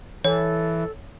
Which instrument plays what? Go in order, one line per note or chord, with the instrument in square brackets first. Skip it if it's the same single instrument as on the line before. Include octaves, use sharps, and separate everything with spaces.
[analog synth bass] E3 [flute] A4 [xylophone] C#5